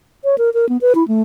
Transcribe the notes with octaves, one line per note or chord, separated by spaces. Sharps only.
C#5
A#4
A#4
B3
B4
E4
A3